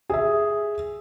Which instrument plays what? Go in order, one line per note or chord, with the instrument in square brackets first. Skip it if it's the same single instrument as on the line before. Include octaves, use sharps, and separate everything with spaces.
[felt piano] G#4 E5